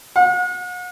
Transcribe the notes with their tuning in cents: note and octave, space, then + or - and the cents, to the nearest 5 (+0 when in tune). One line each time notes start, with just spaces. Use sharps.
F#5 -40